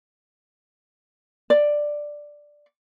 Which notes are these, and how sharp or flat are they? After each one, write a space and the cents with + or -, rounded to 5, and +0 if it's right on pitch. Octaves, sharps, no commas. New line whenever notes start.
D5 +5